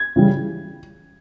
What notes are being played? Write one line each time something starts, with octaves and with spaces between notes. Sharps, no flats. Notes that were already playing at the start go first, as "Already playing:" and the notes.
Already playing: G#6
C#3 E3 G3